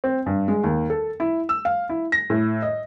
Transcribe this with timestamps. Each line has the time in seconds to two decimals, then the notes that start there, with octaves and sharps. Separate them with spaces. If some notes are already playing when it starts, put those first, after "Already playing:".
0.04 C4
0.26 G2
0.48 G#3
0.64 D#2
0.90 A4
1.20 E4
1.49 E6
1.65 F5
1.89 E4
2.12 A#6
2.30 A2
2.62 D#5